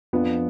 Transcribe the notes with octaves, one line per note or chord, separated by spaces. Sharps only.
F2 F3 B3 D4 F4